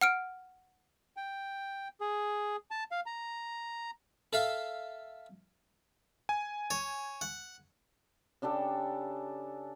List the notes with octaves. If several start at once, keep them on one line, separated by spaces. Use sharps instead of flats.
F#5 F6 D7
G5
G#4
A5
F5
A#5
A4 E5 F5
G#5
C#5
F#5
C#3 D4 G4 A4